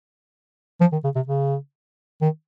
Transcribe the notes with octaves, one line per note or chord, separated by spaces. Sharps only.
F3
D#3
C#3
C3
C#3
D#3